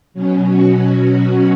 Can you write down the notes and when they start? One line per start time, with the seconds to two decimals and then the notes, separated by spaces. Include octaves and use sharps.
0.14 B2 F#3 C#4
0.44 F#4